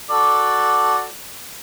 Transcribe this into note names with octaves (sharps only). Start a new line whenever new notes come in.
F#4 A4 D5